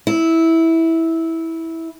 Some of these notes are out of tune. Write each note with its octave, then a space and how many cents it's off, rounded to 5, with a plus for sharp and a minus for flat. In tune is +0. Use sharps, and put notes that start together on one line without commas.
E4 -10